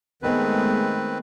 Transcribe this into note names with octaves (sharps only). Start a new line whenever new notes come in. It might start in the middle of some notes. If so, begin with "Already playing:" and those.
D#3 G#3 A3 B3 C4 B4